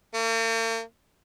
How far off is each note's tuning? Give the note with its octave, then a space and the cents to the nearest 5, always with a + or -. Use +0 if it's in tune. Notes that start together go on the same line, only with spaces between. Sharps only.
A#3 -45